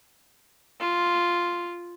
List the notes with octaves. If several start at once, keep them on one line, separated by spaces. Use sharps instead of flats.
F4